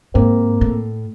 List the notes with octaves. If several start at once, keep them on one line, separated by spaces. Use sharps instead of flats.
G#2 A#3 C4
A2